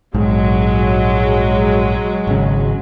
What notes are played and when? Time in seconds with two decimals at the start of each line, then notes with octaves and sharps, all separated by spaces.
0.15 A#1 G#2 F#3 G#3
2.27 G#1 C#3